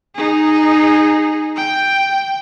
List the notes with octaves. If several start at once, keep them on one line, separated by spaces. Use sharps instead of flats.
D#4 G#4
G5